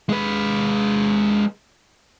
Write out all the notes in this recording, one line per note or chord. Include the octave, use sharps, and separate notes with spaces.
G#3 B4